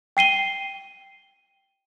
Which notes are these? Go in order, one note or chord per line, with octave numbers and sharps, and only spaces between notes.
G5 C7 D#7 G7